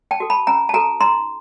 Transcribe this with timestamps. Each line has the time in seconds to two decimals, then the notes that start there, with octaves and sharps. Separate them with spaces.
0.11 G5 A5
0.20 F#4 A4
0.30 A5 B5
0.47 C#4 G#5 A#5
0.69 A5
0.74 F#4 A4 G#5 A#5
1.01 D#4 A#5 C6